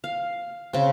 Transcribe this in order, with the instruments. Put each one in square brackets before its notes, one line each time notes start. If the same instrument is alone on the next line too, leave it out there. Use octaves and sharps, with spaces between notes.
[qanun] F5
C#3 C4